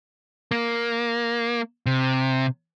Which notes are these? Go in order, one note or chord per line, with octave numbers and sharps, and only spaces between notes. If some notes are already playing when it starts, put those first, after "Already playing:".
A#3
C3